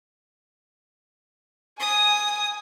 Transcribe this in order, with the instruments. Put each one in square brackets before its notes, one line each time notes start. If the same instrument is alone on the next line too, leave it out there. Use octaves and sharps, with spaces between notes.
[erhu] G#5 [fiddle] D#6